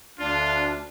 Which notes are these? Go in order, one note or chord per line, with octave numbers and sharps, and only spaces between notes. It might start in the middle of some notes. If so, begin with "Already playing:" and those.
D2 D4 F4